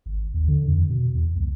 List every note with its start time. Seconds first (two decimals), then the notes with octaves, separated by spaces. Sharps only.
0.06 G#1
0.34 D#2
0.48 D3
0.67 F2
0.90 B2
1.15 E2
1.36 C#2